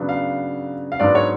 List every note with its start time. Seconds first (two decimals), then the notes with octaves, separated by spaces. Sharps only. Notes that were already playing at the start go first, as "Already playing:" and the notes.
Already playing: C#3 F#3 B3 D4
0.09 F5
0.92 F5
1.00 G#2 F#3 B3 D4 D5
1.15 C#5